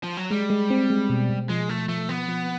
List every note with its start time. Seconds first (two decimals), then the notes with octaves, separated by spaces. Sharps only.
0.03 F3
0.17 F#3
0.31 G3 G#3
0.50 G#3
0.70 C4
0.90 G#3
1.10 B2
1.30 B2
1.49 F3 G#3
1.69 F3 A3
1.88 F3 A3
2.09 F3 B3
2.28 F3